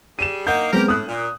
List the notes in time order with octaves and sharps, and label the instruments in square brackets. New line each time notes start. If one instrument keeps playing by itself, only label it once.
[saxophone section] G3 G#4 [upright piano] D#7 E7
[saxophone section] A#3 D#4 [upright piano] F#5 G6
[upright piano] G#3 B3 C4 [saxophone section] G4 A#4
[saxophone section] A2 [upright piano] D#6 F#6
[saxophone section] A#2